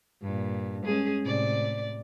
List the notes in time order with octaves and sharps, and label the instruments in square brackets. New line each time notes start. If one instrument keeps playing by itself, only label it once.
[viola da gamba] G2 A#2
G#3 C#4 G#4
A2 C3 D5